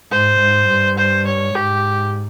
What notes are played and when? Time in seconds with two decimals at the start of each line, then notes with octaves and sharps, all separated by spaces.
0.12 G#2 C5
0.40 G#2
0.69 G2
0.98 C5
1.26 C#5
1.55 G#2 G4